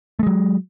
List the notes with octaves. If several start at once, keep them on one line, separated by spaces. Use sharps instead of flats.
F#3 G#3 A3